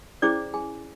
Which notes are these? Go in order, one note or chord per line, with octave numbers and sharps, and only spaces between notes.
C#4 E4 G#4 C5 D5 D6
G#4 G#5